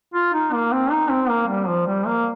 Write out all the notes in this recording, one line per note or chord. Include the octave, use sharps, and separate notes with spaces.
F4
D#4
A#3
C4
D#4
C4
A#3
G3
F3
G3
A#3